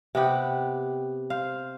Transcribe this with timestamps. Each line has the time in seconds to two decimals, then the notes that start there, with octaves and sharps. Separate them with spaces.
0.15 C3 B3 G4 F#5
1.30 C5 F5